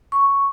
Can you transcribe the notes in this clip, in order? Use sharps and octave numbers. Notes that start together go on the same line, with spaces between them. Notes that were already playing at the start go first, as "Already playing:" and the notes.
C#6